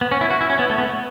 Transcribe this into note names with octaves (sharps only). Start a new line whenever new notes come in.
B3
C#4
E4
F#4
E4
C#4
B3
A3
B3